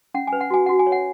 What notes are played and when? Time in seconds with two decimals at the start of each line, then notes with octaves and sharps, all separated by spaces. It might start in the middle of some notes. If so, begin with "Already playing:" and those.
0.14 C#4 F#5
0.27 G#5
0.33 B4
0.41 F#5
0.50 F#4 G#5
0.66 F#4 F#5
0.79 G#5
0.87 C#5
0.92 F#5